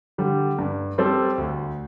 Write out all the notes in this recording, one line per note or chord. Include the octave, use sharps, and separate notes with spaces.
D3 G3
G2
G3 C4 A4
D2